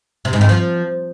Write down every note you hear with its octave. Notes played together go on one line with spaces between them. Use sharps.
C3
G#2
D#3
F3